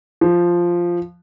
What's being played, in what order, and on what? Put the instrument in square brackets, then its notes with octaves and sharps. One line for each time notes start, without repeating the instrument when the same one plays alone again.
[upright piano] F3